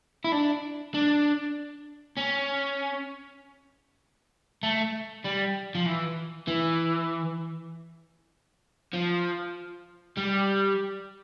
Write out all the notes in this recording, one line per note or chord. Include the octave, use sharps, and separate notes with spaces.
E4
D4
D4
C#4
A3
G3
F3
E3
E3
F3
G3